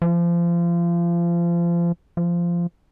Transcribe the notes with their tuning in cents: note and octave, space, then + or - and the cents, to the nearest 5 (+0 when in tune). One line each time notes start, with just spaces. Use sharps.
F3 -30
F3 -15